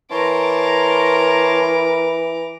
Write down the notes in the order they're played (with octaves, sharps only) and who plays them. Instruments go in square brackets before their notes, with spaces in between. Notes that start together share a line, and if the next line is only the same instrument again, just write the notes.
[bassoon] E3 [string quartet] A#4 [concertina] C#5 A5 C6 [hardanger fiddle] A#5 D6